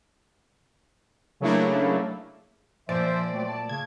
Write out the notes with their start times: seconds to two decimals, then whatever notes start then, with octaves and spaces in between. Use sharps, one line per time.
1.40 C#3 F#3 A3 A#3 D4 E4
2.89 A#2 F3 C5 D5 E5
3.06 F3
3.32 F#3 A3 C4
3.48 A5
3.69 C#3 G#6